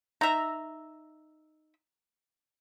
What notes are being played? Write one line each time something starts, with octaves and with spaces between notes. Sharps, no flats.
D#4 E5 A#5